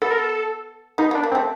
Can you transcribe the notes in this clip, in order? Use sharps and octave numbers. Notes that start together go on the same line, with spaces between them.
B3 A4
A#4
A4
B3 D#4
B3 D4
A#3
C4
A3